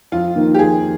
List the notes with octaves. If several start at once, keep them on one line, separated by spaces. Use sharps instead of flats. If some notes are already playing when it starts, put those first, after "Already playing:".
F2 F4
D#3 A#3
G4
F2 G#4